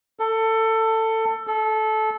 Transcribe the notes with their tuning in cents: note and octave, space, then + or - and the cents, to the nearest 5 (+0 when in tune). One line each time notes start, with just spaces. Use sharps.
A4 +20
A4 -20